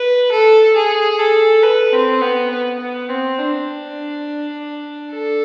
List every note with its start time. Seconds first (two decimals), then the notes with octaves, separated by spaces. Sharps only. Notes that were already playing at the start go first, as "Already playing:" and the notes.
Already playing: B4
0.31 A4
0.76 G#4
1.19 A4
1.63 B4
1.92 C4
2.21 B3
2.50 B3
2.80 B3
3.09 C4
3.38 D4
5.13 A4